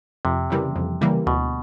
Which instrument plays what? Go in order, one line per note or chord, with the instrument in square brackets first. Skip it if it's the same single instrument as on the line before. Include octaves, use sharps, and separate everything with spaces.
[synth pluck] F2 [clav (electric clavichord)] C3
[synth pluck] C#3 E3 G3 A#3
F2
C#3 E3 G3 A#3
[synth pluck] D2 [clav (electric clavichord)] B2